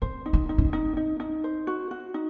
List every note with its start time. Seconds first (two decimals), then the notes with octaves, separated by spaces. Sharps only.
0.02 C4 C5
0.26 D#4
0.33 C4
0.49 D#4
0.58 C#4
0.65 C4
0.73 D#4
0.97 D#4
1.20 D#4
1.44 C5
1.67 F#4
1.91 F#4
2.14 D#4